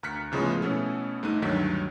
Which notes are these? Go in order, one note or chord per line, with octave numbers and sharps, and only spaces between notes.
D2 A#5 F6 F#6 B6 C#7
A2 C#3 F3 G#3 A3 B3
B2 A3 B3 C#4 E4 A4
G1 G#2 A3 D#4 F#6 D#7
D2 G2 D#3 F#3 B6